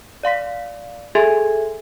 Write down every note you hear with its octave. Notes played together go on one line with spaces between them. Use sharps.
D5 F5 C6 B6
G#4 A4 E5 G#5 C6 G#6